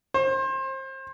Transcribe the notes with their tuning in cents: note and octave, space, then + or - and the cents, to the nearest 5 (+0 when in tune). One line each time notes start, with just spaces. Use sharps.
C5 +30